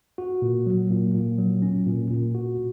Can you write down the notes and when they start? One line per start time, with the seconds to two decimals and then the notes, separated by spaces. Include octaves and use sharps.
0.18 F#4
0.42 A#2
0.66 F#3
0.90 A#2
1.14 A#2
1.38 F#3
1.62 C#4
1.87 A#2
2.10 A#2
2.35 F#4